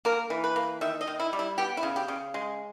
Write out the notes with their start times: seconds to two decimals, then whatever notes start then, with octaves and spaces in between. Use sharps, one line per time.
0.05 A#3 A#4
0.30 E3
0.44 B4
0.56 A#3
0.81 D#3 E5
1.01 D#5
1.07 D#3
1.20 E4
1.33 G3
1.39 E4
1.58 B3 G4
1.77 E4
1.83 C#3
1.96 G4
2.08 C#3
2.34 G#3